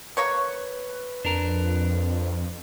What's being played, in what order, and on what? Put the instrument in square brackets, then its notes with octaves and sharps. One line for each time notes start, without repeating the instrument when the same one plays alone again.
[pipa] A#3 C#5 C#6 [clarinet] B4
[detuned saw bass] F2 [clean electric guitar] D4 A#4